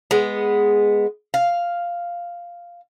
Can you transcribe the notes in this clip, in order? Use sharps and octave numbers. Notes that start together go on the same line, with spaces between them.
G#3 B3
F5